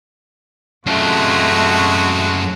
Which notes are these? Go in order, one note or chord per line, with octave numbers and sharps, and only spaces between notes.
F#2 C3 G#3 A3 F4 F#4